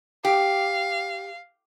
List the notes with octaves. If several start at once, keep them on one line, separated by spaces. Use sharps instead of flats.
G4 F5